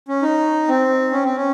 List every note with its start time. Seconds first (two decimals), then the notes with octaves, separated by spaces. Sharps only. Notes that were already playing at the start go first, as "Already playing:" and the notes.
0.08 C#4
0.22 D#4
0.68 C4
1.11 C#4
1.24 C4
1.36 C#4